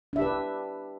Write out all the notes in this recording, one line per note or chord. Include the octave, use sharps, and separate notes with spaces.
D4 G4 B4 E5